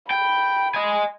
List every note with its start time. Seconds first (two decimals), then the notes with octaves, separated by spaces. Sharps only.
0.10 G5 B5
0.74 D#5 G#5